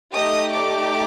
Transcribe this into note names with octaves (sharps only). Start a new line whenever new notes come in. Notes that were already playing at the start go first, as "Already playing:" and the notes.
A3 D#4 G4 D#5 D#6
D5 D6